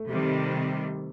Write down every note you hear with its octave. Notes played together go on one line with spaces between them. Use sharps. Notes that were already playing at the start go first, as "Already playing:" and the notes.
Already playing: A3
C3 D#3 G3